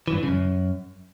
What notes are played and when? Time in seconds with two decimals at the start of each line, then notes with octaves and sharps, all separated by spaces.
0.08 E3
0.13 G2
0.18 E3
0.23 C#3
0.28 F#2